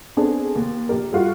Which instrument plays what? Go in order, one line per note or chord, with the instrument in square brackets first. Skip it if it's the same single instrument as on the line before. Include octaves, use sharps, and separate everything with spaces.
[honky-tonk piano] B3 C4 D4 G#4 A4
D#2
A#1 G4 A#4
G3 F4 F#4